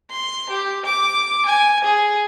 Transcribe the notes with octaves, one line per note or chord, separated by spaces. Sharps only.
C6
G4
D6
G#5
G#4